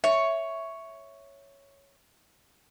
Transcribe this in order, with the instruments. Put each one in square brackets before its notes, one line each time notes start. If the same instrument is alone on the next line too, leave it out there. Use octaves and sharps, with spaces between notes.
[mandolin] C#5 [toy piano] E5